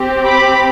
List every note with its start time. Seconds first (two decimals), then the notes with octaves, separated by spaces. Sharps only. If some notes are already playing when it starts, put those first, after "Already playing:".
Already playing: C4 G4
0.25 B5 D6